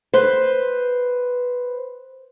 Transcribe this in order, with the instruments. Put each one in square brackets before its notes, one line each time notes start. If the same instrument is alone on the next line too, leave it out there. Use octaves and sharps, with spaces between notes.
[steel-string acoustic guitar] B4 C5